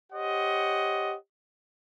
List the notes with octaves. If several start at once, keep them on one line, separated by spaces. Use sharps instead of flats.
G4 C5 C#5 D#5 F#5